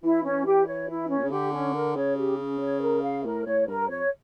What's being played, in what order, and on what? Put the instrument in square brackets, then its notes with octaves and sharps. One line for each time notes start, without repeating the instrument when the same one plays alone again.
[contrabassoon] E3 [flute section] E4
[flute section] C#4
G4
C#5
E4
C#4
[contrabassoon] A#2
C#3
[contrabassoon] D3 [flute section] G4
[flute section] C#4
A#4
[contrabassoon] C#3 [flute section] C#5
[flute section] G4
C#4
C#5
A#4
F5
[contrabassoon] A2 [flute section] A#4
[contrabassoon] A2 [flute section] C#5
[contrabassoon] G2 [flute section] A#4
[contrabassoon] F2 [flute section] C#5